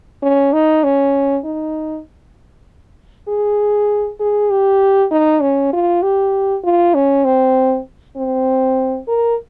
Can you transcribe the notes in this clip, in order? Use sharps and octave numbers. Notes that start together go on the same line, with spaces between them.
C#4
D#4
C#4
D#4
G#4
G#4
G4
D#4
C#4
F4
G4
F4
C#4
C4
C4
A#4